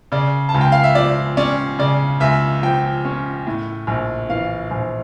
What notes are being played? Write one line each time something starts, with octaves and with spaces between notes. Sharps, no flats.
C#3 D5
A5
C#2
G5
F5
E5
F3 D5
C#4 D5
C#3 D5
C#2 E5
F3 G5
C#4
A2
A#1
E3 F5
A#1